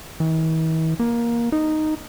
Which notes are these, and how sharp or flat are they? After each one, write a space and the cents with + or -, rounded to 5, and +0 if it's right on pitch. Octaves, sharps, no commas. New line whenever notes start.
E3 -45
A#3 +15
D#4 -5